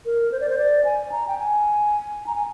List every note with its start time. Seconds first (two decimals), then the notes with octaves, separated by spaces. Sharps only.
0.06 A#4
0.32 C5
0.41 D5
0.49 C5
0.58 D5
0.85 G#5
1.12 A#5
1.27 G5
1.38 G#5
2.27 A#5
2.35 G#5